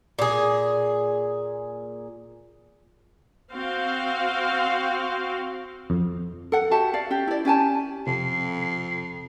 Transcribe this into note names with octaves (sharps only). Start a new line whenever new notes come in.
A#2 G#4
C4 F#4 F5
F2
A4 F#5
F#4 G4 E5 A5
D5 F5
C#4 G4
E4 D5
C#4 G4 G#5 A5
F2 C3 C7